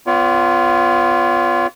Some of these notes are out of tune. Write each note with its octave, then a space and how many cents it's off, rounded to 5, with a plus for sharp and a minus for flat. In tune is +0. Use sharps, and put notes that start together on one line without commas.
B3 +30 F4 +0 C#5 +45